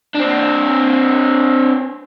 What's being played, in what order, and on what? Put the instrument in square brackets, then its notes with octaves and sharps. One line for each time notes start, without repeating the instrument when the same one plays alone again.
[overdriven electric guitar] C4 D4